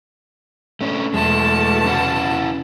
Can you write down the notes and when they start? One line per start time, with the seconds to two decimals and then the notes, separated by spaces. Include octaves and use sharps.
0.81 A3 C#4 D4
1.14 E2 B2 G#3 A3 A5
1.86 C#4 E4 F#5